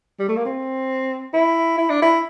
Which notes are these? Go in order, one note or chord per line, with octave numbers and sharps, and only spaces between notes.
G3
A3
A#3
C4
E4
E4
D4
E4